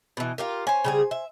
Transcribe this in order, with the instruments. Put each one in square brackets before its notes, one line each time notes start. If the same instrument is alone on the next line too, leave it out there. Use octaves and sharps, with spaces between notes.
[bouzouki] B2 E3
F4 G4 A#4
[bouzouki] C#4 [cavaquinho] C5 G#5
[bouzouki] C#3 G3 G#4
E5